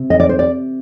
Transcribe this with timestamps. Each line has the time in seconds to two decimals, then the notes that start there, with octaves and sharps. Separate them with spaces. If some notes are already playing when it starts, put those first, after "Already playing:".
Already playing: C3
0.10 D#5
0.20 D5
0.29 C5
0.39 D5